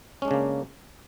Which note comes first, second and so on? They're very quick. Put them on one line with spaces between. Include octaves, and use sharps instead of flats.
C#4 G#3 D4 C#3 A#3